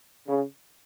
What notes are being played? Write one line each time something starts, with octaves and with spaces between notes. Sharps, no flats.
C#3